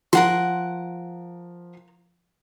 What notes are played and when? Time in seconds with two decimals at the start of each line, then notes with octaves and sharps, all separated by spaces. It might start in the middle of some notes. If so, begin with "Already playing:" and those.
0.13 F3 A#4 F#5 C6